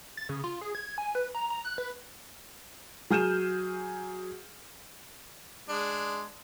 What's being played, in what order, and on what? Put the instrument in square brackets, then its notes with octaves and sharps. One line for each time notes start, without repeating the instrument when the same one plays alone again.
[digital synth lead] A6
C#3
F4
G#4
G#6
G#5
B4
A#5
A#5
F#6
B4
[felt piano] F#3 G#4 F6 G6 D#7 E7
[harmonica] G#3 D4